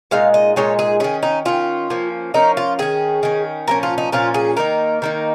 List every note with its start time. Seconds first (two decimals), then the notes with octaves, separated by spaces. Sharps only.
0.11 A#2 G#3 D#4 F5
0.34 D#5
0.56 A#2 G#3 D#4 C#5
0.79 G#4
1.00 D#3 C#4 G#4
1.23 D#4
1.45 D#3 C#4 F4
1.90 F3 A#3 C#4
2.34 F3 A#3 C#4 D#4
2.57 F4
2.79 D#3 C#4 G#4
3.23 D#3 C#4
3.68 A#2 F3 C#4 A#4
3.83 F4
3.98 D#4
4.12 A#2 F3 C#4 F4
4.34 G#4
4.57 D#3 A#3 D#4 A#4
5.02 D#3 A#3 D#4